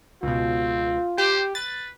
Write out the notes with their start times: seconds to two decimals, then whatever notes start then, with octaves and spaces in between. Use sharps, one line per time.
0.23 C#2 B2 C4 F4
1.18 G4 C5
1.55 B4 A6